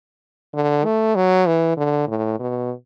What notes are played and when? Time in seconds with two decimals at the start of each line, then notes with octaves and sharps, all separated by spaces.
0.54 D3
0.85 A3
1.16 F#3
1.47 E3
1.77 D3
2.08 A2
2.39 B2